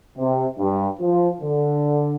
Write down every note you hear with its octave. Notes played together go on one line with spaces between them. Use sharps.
C3
G2
F3
D3